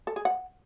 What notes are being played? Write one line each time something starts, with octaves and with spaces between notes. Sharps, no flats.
A4
G#4
F#5